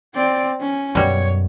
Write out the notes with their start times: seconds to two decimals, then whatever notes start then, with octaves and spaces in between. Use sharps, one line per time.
0.14 C4 D5
0.60 C#4
0.95 F#2 B2 G3 C#5